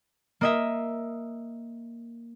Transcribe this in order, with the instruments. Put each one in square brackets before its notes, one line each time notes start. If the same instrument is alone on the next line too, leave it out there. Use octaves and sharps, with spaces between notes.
[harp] A#3 D#5 E5